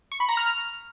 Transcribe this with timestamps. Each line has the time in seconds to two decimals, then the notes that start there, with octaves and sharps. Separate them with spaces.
0.12 C#6
0.20 B5
0.29 A#5
0.37 F6